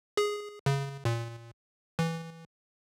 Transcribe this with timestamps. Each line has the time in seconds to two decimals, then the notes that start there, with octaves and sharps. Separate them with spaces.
0.17 G#4
0.66 C#3
1.05 A#2
1.99 E3